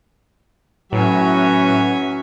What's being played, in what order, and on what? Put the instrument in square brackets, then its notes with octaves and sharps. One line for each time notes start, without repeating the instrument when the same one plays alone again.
[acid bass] A2 [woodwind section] E3 F#3 [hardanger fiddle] C#4 E5 [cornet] F#4